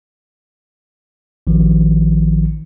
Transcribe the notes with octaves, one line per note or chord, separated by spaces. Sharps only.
A1 D#3 F3